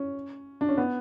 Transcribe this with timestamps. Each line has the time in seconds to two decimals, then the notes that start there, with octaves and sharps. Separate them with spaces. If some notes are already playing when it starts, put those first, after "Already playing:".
Already playing: C#4
0.61 D4
0.69 C#4
0.77 B3